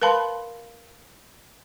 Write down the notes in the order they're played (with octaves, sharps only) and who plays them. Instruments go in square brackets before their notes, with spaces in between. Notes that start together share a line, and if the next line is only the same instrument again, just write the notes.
[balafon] A#4 B4 F5 A5 B5 C6